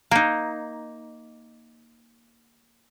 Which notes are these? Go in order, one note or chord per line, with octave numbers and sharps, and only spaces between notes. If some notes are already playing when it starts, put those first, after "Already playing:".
A#3 D#4